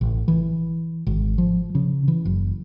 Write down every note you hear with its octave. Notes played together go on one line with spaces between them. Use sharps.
A1
E3
G#1
F3
C#3
E3
F#1